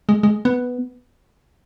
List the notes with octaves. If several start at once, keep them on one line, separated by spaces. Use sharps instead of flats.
G#3
G#3
B3